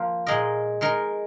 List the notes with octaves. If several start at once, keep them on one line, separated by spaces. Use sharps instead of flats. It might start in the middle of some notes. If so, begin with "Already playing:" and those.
Already playing: F3 A#3 F4 C5
A#2 G#3 D#4 A#4 D#5
G#3 D#4 A#4